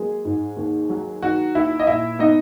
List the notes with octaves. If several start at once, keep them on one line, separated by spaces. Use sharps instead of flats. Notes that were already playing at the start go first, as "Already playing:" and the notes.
Already playing: F#3 G#3 A#3 G#4
G#2
D#2
F#3
D#3 F#4
D#2 E4 E5
D#5
A#2 E4 E5
B3 D#4 D#5